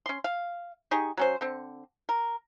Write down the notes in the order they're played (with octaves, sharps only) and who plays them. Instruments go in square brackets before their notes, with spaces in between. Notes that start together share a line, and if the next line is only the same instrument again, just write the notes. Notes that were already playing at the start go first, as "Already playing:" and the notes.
[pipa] C#4 C6
F5
D#4 G4 G#4 C#6
F#3 C#4 C5
D3 C4
A#4